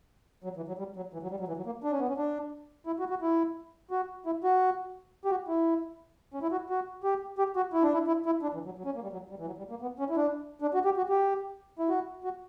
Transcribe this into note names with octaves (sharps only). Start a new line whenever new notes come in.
F#3
E3
F#3
G3
F#3
E3
F#3
G3
F#3
E3
F#3
A#3
D4
C#4
B3
C#4
D4
E4
F#4
F#4
E4
F#4
E4
F#4
G4
F#4
E4
C#4
E4
F#4
F#4
G4
G4
F#4
E4
D4
E4
E4
E4
D4
E3
F#3
F#3
C#4
A#3
G3
F#3
G3
E3
F#3
G3
A#3
B3
C#4
E4
D4
D4
F#4
G4
F#4
G4
E4
F#4
F#4